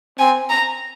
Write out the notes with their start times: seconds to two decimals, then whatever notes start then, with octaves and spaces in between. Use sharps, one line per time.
0.19 C4 G#5
0.50 A#5